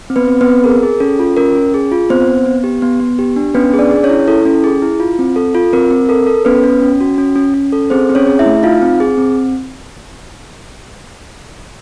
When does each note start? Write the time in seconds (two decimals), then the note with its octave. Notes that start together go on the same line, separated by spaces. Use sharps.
0.10 C4
0.16 B3 B4
0.28 C4
0.41 B3 B4
0.46 C4
0.64 G#4 A#4
0.83 G#4
1.00 C#4 A4
1.19 F4
1.37 C#4 A#4
1.55 C#4
1.74 G#4
1.92 F4
2.10 B3 C4 C5
2.27 B3
2.46 B3
2.64 G4
2.82 B3
3.00 B3
3.19 G4
3.36 D4
3.54 B3 C#4 B4
3.73 G#4
3.79 D4 D5
3.91 G#4
4.03 C#4 C#5
4.09 E4
4.28 E4 A4
4.45 C#4
4.64 G#4
4.82 E4
5.00 F4
5.19 C4
5.36 A4
5.55 F4
5.73 C4 A#4
5.91 C4
6.09 A4 A#4
6.27 A4
6.45 B3 C#4 B4
6.64 C#4
6.82 C#4
7.01 F#4
7.18 C#4
7.36 C#4
7.54 C#4
7.72 A4
7.90 C4 G#4 C5
8.10 C4
8.15 C#4 C#5
8.27 G#4
8.39 E4 E5
8.46 A3
8.63 D#4 F4 F5
8.82 C4
9.00 G#4
9.17 C4